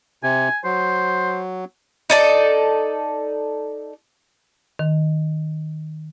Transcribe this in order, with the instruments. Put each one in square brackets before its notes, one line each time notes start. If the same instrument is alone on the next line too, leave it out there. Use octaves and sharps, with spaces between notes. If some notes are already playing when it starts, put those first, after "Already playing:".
[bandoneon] C3 [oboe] G#5
[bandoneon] F#3 [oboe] C5
[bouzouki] D#4 A4 D5
[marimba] D#3